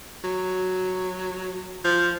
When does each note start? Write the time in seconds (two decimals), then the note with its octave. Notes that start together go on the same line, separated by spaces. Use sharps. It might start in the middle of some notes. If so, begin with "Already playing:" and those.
0.24 F#3
1.85 F3